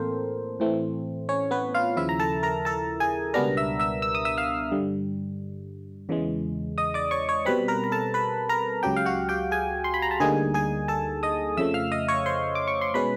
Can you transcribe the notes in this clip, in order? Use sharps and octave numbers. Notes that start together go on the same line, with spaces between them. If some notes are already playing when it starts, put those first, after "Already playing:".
Already playing: A2 E3 A#3 C4 A4 A#4 C5
A2 E3 A3 C4
C#4 C#5
B3 B4
F4 F5
D#2 C#3 F3 E4 E5
A#5
A4 A5
A#4 A#5
A4 A5
G#4 G#5
C#2 B2 G3 B3 D4 A#4 A#5
E5 E6
E5 E6
E6
D#6
E5 E6
F5 F6
G2 D3 G3
E2 C#3 E3 G#3
D#5 D#6
D5 D6
C#5 C#6
C#5 C#6
B2 G3 C4 B4 B5
A#4 A#5
A#5
A4 A5
B4 B5
A#4 A#5
C#2 C#3 F#3 G4 G5
F5
F#4 F#5
G4 G5
G#4 G#5
C6
B5
A#5
A5
D2 D3 G3 A#3 D#4 G#4 G#5
G#4 G#5
A4 A5
D#5 D#6
F2 C#3 F3 A3 E5 E6
F5 F6
D#5 D#6
C#5 C#6
C5 C6
D6
C#6
C6
B2 G#3 C#4 B4 B5